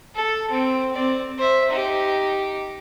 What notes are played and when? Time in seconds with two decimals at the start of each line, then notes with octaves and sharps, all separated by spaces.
0.15 A4
0.51 C4 G5
0.93 C4 D5
1.39 C5 E5
1.70 D#4 G4